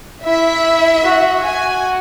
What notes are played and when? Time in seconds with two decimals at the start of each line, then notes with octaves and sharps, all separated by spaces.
0.25 E4 E5
1.04 F#4
1.43 F#4 G#5